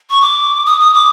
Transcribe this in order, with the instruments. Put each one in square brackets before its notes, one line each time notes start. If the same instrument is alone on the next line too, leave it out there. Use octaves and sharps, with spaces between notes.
[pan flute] C#6
D6
D#6
D#6
D6